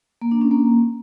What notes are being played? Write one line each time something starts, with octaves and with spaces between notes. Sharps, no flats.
A#3
D4
C#4
A#3